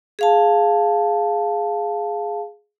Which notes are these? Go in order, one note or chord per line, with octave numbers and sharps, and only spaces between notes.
G#4 F5 A5